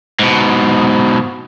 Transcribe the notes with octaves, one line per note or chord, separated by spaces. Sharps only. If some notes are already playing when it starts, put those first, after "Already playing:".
G#2 B2